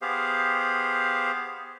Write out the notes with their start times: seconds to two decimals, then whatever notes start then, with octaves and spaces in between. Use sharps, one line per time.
0.02 B3 G4 G#4 C5 F5